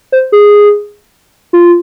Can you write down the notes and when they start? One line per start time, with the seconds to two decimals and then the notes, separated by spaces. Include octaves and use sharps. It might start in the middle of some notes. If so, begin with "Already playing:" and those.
0.12 C5
0.32 G#4
1.53 F4